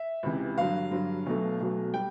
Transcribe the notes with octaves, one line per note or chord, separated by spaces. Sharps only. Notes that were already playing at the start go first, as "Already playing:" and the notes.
Already playing: E5
C#2 C3 E3
G2 D3 F#3 F5
G2 D3 F#3
B1 B2 F#3 A3
B1 B2 F#3 A3
G3 G5